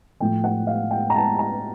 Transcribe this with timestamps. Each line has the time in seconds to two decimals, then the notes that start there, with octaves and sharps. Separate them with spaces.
0.20 A2 F3 A3 G5
0.44 F#5
0.67 F5
0.91 G5
1.10 A#5
1.15 A5
1.39 A#5